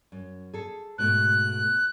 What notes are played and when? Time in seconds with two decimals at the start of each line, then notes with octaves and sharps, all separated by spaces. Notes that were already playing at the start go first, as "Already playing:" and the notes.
0.12 F#2
0.54 G#4 A4
0.98 G#2 B2 A3 F#6